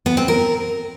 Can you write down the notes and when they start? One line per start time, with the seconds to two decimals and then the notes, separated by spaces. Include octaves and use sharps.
0.06 B3
0.17 C4
0.28 A#4